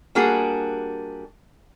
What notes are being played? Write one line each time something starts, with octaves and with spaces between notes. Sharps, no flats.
G3 A#3 D4 F#4 G#4